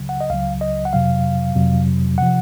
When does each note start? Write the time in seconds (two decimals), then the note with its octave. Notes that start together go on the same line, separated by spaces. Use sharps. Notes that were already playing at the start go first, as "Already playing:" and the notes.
Already playing: C#2 C#3 F#3
0.09 F#5
0.21 D#5
0.30 C#2 C#3 F#3 F5
0.61 D#5
0.85 F#5
0.93 F2 C3 F#3 F5
1.56 F2 C3 F#3
2.18 C3 F3 F#5